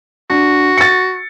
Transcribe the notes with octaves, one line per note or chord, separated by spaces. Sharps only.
D4 F#4
A6 C#7